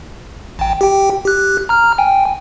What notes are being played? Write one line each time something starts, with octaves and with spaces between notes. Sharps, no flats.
A1 G5
G4 G5
G4 F#6
A#5 F6
G5 G#5